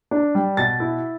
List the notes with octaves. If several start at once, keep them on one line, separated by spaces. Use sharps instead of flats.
D4
G3
B2 A6
E4